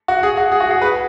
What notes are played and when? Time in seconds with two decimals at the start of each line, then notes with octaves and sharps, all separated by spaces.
0.08 F#4
0.23 G#4
0.37 F#4
0.52 G#4
0.60 F#4
0.71 G#4
0.81 B4